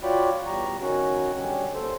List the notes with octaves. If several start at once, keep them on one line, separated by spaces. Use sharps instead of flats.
F4 F#4 C#5 D5 G5 B5
E2 G3 A#5 C#6
D#3 C#4 F#4
D3 G3 C#4
D#2 A4 C5